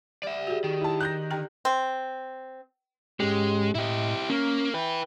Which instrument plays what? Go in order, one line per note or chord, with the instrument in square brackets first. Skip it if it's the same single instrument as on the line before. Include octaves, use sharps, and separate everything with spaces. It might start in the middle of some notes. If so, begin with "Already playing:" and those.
[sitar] G3 [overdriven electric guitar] D5 E5
[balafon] F#4 G#4
[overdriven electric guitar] D#3
[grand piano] E4 A5
[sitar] D#4 [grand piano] F#6 G6 A#6
[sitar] D3 [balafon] G4 G5 A#5
[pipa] C4
[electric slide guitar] G#2 C#4 G4 [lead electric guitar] G#3
[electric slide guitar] A2 D#5 [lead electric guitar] E4 G4
[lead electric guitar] A#3 [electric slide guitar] C#4
[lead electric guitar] E4 B4 [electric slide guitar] G5